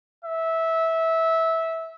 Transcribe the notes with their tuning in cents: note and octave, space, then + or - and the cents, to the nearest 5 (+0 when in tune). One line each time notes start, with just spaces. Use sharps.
E5 -15